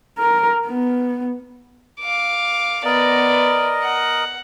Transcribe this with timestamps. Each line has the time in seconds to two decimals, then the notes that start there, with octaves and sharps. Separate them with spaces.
0.19 A#4
0.67 B3
2.00 F5 D6
2.85 B3 A#4 D5 D#5
3.83 F#5